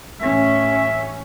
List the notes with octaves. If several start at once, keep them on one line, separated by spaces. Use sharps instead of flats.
A1 C#4 E5